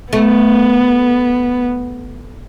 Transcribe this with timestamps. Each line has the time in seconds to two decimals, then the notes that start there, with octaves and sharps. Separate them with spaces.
0.13 A3 B3